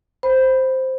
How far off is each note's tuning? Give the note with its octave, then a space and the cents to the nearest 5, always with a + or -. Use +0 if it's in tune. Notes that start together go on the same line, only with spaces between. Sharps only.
C5 +0 B5 +0